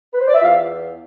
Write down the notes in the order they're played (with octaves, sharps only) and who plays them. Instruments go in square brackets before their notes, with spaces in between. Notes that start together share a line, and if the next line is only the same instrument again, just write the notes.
[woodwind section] B4
C5
D5
E5
E2 F4 F5